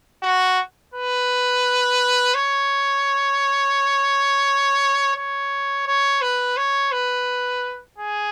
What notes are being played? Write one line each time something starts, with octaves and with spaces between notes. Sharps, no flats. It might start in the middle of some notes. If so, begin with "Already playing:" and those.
F#4
B4
C#5
C#5
C#5
B4
C#5
B4
G#4